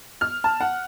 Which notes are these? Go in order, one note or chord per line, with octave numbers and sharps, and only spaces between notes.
F6
A5
F#5